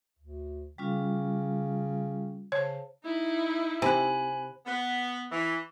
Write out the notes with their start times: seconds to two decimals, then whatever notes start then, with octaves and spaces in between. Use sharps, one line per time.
0.19 D2
0.78 C#3 G3 C#4 F4
2.52 C#3 C5 C#5 A5
3.04 D#4 E4
3.82 C3 G#5 B5 F#6
4.66 B3
5.32 E3